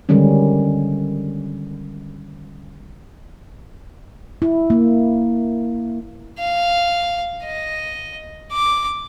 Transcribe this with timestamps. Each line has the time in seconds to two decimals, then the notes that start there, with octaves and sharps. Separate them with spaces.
0.09 D3 D#3 G3 G#3 C#4
4.42 E4
4.70 A#3
6.39 F5
7.44 D#5
8.53 D6